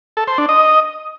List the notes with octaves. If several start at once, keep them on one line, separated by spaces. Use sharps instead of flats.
A4
C5
D4
D#5